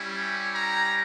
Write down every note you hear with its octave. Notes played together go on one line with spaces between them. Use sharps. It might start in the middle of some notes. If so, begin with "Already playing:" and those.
Already playing: G3 C#4 E4 G4
A#5